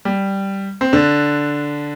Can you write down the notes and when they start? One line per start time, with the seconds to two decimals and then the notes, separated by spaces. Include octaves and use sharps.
0.05 G3
0.81 C4
0.93 D3 D4